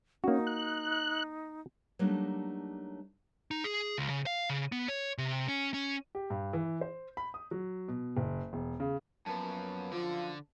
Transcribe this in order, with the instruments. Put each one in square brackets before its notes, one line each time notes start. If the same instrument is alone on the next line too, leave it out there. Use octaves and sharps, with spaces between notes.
[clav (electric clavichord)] A#3 F#4 [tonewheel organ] C#4 [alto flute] D#4
[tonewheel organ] F#6
[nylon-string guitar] F#3 G3 A3 A#3 D4 D#4
[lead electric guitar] D#4
G#4
C#2
C#3
F5
C#3
B3
C#5
C3
C#4
C#4
[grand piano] G4
G2
E3
C5
B5
D#6
F#3
B2
F#1
E1
C#3
[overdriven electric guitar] F#2 [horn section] F3 A#3 B3 [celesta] A5
[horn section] F#2 F3 [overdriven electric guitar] D3 [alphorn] F4